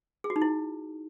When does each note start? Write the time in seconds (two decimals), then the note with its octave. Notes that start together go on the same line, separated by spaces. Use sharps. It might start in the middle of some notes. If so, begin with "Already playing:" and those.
0.24 G#4
0.30 F#4
0.36 D#4
0.42 E4